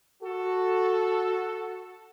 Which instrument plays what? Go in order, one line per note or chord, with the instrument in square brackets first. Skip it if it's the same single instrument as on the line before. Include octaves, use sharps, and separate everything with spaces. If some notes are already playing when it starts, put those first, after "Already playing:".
[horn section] F#4 A4